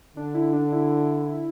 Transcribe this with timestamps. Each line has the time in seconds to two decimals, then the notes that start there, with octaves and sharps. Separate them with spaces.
0.16 D3 D4
0.35 E4
0.53 D4
0.72 E4